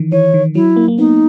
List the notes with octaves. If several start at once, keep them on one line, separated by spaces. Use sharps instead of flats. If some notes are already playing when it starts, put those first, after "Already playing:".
Already playing: D#3 E3
E3 C#5
D#3
F#3 E4
A#3
A#3
B3 D#4